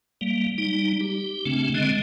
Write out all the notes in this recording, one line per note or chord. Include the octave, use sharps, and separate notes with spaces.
G3 A#3
G3 D#4
G4
C#3 A3 C4 D4
D3 G#3 C4 D#5